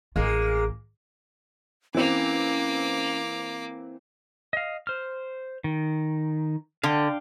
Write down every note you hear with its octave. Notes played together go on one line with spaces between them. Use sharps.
A1 G#3 A#3 F4
E3 A#3 C4 C#4 D6
D#5 F5
C5 F6
D#3
D3 F5 G5